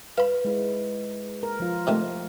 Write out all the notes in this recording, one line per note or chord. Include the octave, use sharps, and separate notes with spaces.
B4 F5 B5
G#3 E4
A#4
F3 F4
C3 D#3 A3